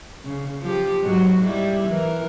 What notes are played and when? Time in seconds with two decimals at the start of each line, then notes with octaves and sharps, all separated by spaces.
0.24 C#3
0.62 F3 G4
1.03 G#2 F#3 F#4
1.44 G3 E4
1.89 E3 A#4